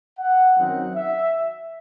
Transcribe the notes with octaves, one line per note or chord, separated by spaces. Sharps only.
F#5
F#2 D#3 F#3 C4 D#4 F#5
E5